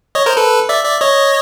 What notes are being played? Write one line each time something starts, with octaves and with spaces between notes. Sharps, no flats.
C#5 D#5
A#4 C5
A4 B4
D5 E5
D5 E5
C#5 D#5